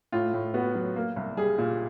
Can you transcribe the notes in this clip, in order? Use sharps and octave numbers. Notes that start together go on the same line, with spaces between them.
A2 F4
A2
B3 F#4
F#3
A#3
C2
G3 G#4
A#2